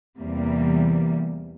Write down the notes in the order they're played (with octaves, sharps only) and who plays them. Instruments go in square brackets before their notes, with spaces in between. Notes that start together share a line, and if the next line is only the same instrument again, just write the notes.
[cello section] E2 C3 E3 G3 A#3